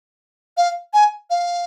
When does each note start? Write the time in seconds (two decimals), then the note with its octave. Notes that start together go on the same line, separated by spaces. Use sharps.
0.57 F5
0.94 G#5
1.30 F5